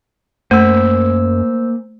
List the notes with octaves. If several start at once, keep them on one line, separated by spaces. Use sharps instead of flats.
F#2 A3 A#3 C5 G#5 B5 E6